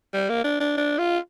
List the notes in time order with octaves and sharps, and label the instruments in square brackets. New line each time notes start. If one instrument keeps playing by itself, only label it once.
[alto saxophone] G3
A#3
D4
D4
D4
F4